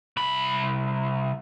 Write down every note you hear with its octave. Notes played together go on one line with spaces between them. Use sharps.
C2 B5